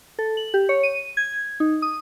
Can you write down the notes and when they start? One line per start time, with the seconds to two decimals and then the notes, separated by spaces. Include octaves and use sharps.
0.19 A4
0.37 F#7
0.54 G4
0.69 C#5
0.83 D#7
1.17 G#6
1.60 D#4
1.82 D#6